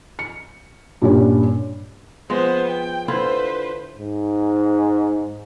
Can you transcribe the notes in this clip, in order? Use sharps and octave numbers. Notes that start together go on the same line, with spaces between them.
C#7
G2 A#2 G3 C#4
F3 G#3 B3 C5
G5
D3 E4 F4 B4 C5
G#2